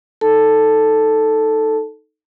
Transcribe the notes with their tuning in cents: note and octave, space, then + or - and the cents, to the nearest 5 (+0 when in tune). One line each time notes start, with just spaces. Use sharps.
D#4 +0 A4 +0 A5 +0